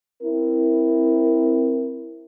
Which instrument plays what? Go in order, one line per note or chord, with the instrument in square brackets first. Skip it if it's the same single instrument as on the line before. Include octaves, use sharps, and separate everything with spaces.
[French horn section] C4 E4 A#4